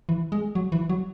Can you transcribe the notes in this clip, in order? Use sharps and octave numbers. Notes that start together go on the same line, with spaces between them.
E3
G#3
F#3
E3
F#3